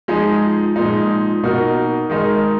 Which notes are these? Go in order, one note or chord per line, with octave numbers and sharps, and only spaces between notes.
F3 G#3 D#4 G#4
A#2 F3 G#3 D#4
B2 A#3 D#4 F#4 A#4
D#3 G#3 D#4 A#4